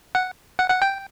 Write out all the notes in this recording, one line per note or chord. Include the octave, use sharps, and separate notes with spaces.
F#5
F#5
F#5
G5